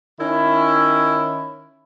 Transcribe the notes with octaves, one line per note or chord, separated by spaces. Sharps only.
D#3 C#4 E4